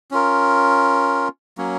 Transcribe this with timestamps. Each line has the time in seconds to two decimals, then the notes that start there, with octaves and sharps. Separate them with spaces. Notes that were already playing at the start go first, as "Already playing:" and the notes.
0.11 C#4 F4 A#4
1.58 F#3 A#3 C#4